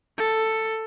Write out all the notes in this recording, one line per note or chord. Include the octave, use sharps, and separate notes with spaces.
A4